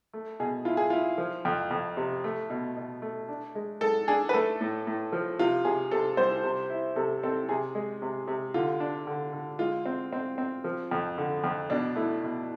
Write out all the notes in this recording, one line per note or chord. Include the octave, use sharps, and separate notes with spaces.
A3
B2 G#4
E4 F4
G#4
E4 F4
F3
F2
F2
C3
A3
B2
B2
A3
D4
G#3
G#3 A4
D4 G#4
B4
A3 A4
A2
A2
F3
C3 F4
C3 G#4
C3 A4
C2 C5
C3
E4
C3 A4
C4 A4
C3 G#4
G#3
C3
C3
D3 F4
D4
D3
D3
G#3 F4
C4
C4
C4
F3
F2
D3
F2
B2 D4
A3 E4
B2